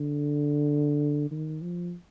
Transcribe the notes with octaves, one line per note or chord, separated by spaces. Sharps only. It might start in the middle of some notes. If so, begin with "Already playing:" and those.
Already playing: D3
D#3
F3